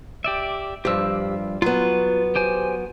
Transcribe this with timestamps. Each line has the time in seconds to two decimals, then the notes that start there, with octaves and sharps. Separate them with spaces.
0.24 G4 D5 E5
0.85 G2 F3 G4 E6
1.62 F#3 B3 F4 B4
2.35 G4 C5 G#5